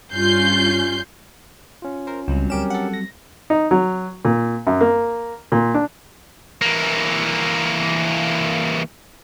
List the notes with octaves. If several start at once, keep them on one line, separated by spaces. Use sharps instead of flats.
G2 C#4 F4 G6 C7
C#4 F4
A#4 C5
C#2 F#3 G3 C4
D2 C#4 G4 A#4 D7 E7
A4 F#5
A#6
D#4
F#3
A#2
F#2
A#3
A#2
D4
E3 A#3